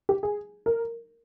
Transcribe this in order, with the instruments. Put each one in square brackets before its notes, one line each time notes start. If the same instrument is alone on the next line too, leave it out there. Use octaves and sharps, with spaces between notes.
[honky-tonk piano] G4
G#4
A#4